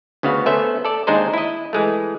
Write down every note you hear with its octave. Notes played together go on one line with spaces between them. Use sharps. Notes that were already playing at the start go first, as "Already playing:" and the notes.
D2 C#3 B3 F#4 F5
A3 B3 C#4 C5 E5
A4 D5
D#2 G#3 D4 D#4 C5
E4 D#5
E3 G#3 A3